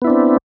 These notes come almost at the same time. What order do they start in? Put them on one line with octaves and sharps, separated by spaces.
B3 E4 D4 C4